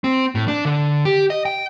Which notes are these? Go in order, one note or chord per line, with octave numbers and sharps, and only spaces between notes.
C4
A2
D4
D3
G4
D#5
G5